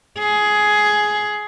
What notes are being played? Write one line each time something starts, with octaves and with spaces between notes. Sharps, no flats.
G#4